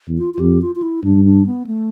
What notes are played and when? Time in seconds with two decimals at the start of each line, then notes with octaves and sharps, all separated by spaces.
0.08 E2
0.18 F4
0.34 F4
0.40 F2 G4
0.62 F4
0.75 F4
0.82 E4
1.04 G2 D4
1.25 D4
1.46 B3
1.67 A3